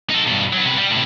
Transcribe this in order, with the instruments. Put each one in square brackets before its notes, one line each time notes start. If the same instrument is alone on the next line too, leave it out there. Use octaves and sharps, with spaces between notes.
[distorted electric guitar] D#4 A4
G2 B2
F#3 B3
C3 B4
G3
A2 C3